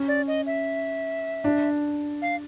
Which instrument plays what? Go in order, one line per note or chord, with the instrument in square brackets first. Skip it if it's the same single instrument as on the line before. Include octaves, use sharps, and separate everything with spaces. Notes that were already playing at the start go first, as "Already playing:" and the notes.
Already playing: [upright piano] C#4
[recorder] D5
D#5
E5
[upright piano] D4
[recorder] F5